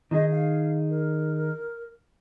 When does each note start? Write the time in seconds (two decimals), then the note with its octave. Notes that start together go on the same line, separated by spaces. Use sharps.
0.11 D#3 D#4 G#4 D#5
0.31 F5
0.90 A#4